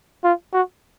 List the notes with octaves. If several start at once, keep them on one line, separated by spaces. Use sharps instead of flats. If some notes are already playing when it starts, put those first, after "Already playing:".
F4
F#4